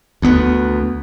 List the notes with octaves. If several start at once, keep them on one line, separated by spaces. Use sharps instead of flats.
D2 B3